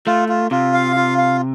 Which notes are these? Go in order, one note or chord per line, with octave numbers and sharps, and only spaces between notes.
A3 F4
F4
C3 F4
F5
F4
F5